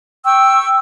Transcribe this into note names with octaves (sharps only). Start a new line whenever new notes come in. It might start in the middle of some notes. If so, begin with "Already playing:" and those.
G5 C#6 E6